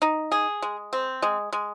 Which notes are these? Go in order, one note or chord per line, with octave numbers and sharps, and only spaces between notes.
D#4
G#4
G#3
C4
G#3
G#3